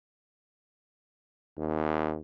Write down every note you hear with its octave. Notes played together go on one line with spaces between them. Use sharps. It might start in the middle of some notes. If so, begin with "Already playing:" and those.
D#2